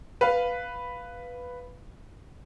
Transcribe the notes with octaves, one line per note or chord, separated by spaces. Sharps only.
B4 F5